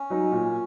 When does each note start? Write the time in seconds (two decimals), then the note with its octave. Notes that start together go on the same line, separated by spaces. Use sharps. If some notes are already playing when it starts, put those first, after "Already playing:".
Already playing: C#4
0.10 F#3 D#4
0.32 A#2